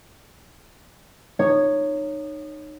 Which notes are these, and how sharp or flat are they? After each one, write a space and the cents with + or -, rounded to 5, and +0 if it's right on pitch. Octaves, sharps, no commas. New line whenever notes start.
D#4 -25 C#5 +0